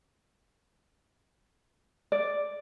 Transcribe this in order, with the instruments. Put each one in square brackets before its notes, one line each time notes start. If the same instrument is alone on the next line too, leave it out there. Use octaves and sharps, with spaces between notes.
[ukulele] D5